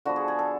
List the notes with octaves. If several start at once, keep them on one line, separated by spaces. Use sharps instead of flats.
D3 F3 B3 F#4
G#4
G#4
A4